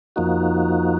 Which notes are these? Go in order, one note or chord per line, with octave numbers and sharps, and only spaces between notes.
F2 F3 A#3 D#4 F#4